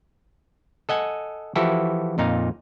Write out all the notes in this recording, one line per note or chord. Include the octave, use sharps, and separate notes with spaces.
A4 D#5 F#5 G#5
E3 F3 E4 F#4 G4 A4
F2 A#2 D#4 F5